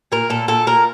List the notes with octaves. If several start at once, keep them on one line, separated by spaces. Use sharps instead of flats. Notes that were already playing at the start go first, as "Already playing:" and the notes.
A#2 A#4
A#2 A4
A#2 A4
A#2 A#4